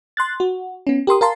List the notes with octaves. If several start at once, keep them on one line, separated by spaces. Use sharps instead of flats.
C6 F#6 A6
F#4
B3 C#4
G4 A#4 C6 D#6
A#4 F5 A5 C6